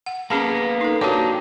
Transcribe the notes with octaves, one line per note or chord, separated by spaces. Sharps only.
F#5
A#3 B3 C#4 G#4 A5
D#4 A4
A#3 D4 F#4 G4 C#5